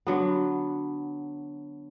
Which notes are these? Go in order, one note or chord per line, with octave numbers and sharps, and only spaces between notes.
D3 F#3 B3